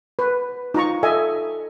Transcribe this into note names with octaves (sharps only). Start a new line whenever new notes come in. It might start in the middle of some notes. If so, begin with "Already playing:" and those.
B4
D#4 F4 A#5 C#6
A4 D#5 E5 G#5